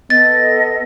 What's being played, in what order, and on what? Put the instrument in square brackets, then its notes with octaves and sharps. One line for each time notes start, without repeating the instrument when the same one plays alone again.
[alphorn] B3 [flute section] A4 D#5 [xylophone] A6